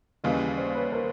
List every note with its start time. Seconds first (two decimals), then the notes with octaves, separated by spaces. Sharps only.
0.24 D#2 C#3 E3 G3 D#5 F5
0.57 C5 D5
0.75 B4 C#5
0.92 A#4 C5